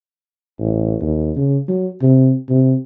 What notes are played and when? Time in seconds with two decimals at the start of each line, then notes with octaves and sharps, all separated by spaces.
0.60 A1
1.01 D#2
1.36 C#3
1.69 F#3
2.02 C3
2.50 C3